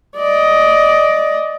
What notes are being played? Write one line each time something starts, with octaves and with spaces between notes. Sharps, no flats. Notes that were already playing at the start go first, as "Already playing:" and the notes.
D5 D#5